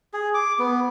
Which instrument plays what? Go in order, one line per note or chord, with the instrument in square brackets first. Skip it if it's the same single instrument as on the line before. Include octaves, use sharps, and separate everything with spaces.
[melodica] G#4
D6
B3